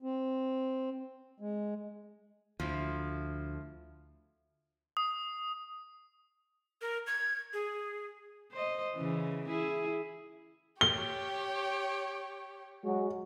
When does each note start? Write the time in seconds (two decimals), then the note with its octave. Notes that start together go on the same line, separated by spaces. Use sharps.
0.02 C4
1.40 G#3
2.60 D2 F3 E4 A4
4.97 D#6
6.82 A#4
7.07 G#6
7.53 G#4
8.52 C5 D#5
8.95 C#3 E3
9.48 E4 G#4
10.81 G4 C#5 G7
12.84 F#3 G#3 F#4